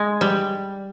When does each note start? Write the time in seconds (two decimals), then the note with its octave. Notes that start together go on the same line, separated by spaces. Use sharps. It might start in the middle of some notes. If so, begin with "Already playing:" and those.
Already playing: G#3
0.21 G3